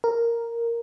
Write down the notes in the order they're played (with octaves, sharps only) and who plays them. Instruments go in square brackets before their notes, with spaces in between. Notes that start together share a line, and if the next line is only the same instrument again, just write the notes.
[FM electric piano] A#4